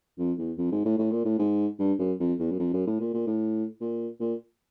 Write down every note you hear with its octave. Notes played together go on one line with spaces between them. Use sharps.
F2
E2
F2
G#2
A2
A2
A#2
A2
G#2
G2
F#2
F2
E2
F#2
F2
F#2
A2
A#2
A#2
A2
A#2
A#2